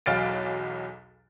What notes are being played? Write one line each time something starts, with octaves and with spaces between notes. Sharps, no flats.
B1 E2 F#3 F5 A6 D7